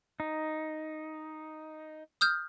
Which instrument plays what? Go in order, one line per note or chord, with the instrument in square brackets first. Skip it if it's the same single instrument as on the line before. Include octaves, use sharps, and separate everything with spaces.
[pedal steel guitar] D#4
[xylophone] D#6 F6 G6